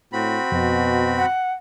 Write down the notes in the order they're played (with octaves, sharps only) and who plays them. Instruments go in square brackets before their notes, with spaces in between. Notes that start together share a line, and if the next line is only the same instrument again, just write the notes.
[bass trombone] A2 [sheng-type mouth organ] C4 F#4 B5
[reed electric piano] F2 [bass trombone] B2
[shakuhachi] F#5